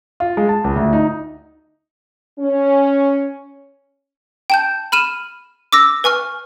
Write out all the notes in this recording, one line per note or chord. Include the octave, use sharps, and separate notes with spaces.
F4
G#3
A5
C#2
D2
D#4
C#4
G5 A5 G6
B5 F6 D#7 E7
D6 E6 A#6
B4 G#5 C#6 F6